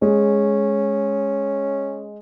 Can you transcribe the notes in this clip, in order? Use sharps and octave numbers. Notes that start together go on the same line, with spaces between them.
G#3 C#4